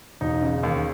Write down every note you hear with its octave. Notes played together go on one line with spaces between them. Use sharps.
E1 D#4
C#3
D#2